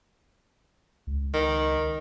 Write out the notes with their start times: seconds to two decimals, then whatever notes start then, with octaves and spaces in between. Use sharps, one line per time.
1.07 C#2
1.34 D#3